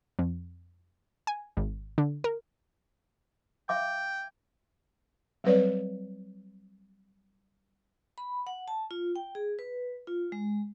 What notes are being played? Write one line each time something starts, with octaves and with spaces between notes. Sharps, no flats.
F2
G#5
G#1
D3
A#4
E5 F5 G5 D6
F#3 G3 C4 B4 C#5 D5
B5
F#5
A5
F4
G5
G#4
B4
F4
G#3